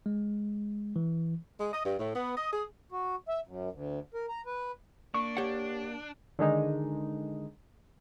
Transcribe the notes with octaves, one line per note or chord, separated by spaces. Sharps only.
G#3
E3
G#3
D#5
G2
A2
B3
D#5
G#4
F#4
E5
F#2
D2
A#4
A#5
B4
A#3 D4 C#6
G4 C#5 F#5
D3 D#3 G#3 D#4